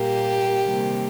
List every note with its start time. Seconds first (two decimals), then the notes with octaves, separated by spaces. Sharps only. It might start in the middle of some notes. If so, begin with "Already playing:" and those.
Already playing: A#2 G3 A#3 G4
0.63 C3 D#3 G3 A#3